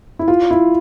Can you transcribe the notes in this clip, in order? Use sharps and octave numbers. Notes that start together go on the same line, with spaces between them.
E4
F4
E4